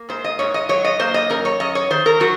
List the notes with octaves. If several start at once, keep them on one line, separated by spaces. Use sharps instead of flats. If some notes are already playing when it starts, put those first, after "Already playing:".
Already playing: A#3
G#2 C5
D#5
G#2 C#5
D#5
F#3 C#5
D#5
A#3 C5
D#5
F#2 A#4
C#5
F#2 D#5
C#5
D#3 C5
A#4
F#3 F#4